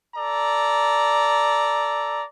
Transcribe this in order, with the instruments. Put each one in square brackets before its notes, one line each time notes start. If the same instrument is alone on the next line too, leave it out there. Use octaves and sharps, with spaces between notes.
[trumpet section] A4 D5 A#5